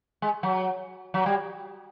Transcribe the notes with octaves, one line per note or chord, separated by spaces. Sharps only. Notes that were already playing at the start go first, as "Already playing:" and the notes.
G#3
F#3
F#3
G3